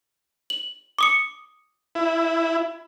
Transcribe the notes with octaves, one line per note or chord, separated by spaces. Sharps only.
F#7
D6 D#6 C#7
E4